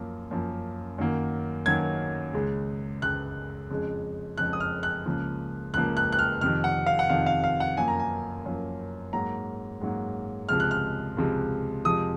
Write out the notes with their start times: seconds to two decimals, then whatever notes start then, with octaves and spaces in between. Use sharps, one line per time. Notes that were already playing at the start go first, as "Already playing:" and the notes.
Already playing: F#2 F3 A#3
0.31 F#2 F3 A#3
0.98 F#2 D#3 F#3 A#3
1.66 F#2 D#3 F#3 A#3 G#6
2.34 C#2 C#3 G#3
3.02 C#2 C#3 G#3 F#6
3.70 F2 C#3 G#3
4.38 F2 C#3 G#3 F#6
4.53 D#6
4.60 F6
4.83 F#6
5.06 C#2 C#3 F3 A#3
5.74 C#2 C#3 F3 A#3 F#6
5.97 F#6
6.12 F#6
6.19 F6
6.41 F2 C3 D#3 F6
6.64 F#5
6.86 F5
6.99 F#5
7.10 F2 C3 D#3 F5
7.26 F5
7.44 F5
7.60 F#5
7.77 F#2 F3 A#3 G#5
7.88 A#5
7.99 G#5
8.46 F#2 F3 A#3
9.13 G#2 F#3 A#3 A#5
9.81 G#2 F#3 A#3
10.49 C#2 C3 F3 G#3 F6
10.60 F#6
10.71 F6
11.17 C#2 C3 F3 G#3
11.85 F2 C3 F3 G#3 D#6